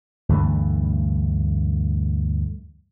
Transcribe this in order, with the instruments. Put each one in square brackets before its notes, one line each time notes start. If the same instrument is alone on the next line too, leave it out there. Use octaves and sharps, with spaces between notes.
[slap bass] D2 G2 E3 A3